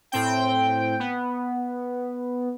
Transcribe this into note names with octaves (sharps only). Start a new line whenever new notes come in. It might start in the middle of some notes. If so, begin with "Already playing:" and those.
A2 C4 G5
B3